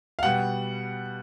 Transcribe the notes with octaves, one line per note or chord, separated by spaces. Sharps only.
F5
B2 G3 F#5